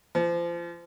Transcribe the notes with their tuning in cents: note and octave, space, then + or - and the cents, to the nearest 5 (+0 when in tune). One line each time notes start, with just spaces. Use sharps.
F3 -30